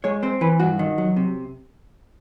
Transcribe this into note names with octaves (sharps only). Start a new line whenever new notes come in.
G#3 C#5
C4 C5
E3 B4
G2 F#4
D#3
F#3
C3